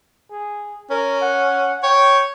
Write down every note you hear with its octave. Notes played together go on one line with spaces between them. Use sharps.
G#4
C#4 A#4
F#5
C#5 G5